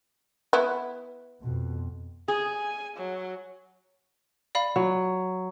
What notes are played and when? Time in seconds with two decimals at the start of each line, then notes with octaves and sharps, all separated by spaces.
0.53 B3 E4
1.43 F2 B2
2.28 G#4 G#5
2.97 F#3
4.55 D5 F5 B5
4.76 F#3